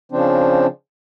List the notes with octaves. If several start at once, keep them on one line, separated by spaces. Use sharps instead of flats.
C#3 F3 C4 D4